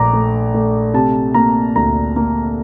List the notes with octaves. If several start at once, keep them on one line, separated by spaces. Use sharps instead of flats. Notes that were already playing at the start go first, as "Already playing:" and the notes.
Already playing: A#1 A3 A#5 D6
A3
A3
C3 A5
A#3 A#5
D2 A#5
A#3